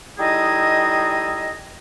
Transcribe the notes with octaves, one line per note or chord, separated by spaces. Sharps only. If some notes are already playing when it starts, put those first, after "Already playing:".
G3 D#4 E4 G#4 A4 D#5